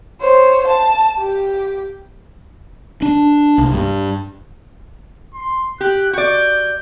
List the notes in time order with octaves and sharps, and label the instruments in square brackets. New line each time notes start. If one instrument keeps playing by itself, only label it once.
[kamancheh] C5 C#5
A5
G4
[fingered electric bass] D4
C2
G2
[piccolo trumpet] C6
[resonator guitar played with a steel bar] G4 [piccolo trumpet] F#6
[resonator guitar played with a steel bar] F#4 D5 [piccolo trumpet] G6